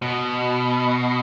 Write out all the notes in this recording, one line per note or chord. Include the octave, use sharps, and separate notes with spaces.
B2